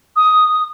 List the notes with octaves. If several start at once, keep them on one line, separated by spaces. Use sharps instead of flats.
D#6